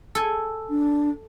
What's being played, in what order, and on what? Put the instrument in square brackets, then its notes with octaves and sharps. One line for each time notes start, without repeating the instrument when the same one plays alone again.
[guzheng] A4 G#5
[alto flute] D4